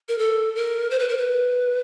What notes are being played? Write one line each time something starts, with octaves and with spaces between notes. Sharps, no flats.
A#4
A4
A#4
C5
B4
A#4
B4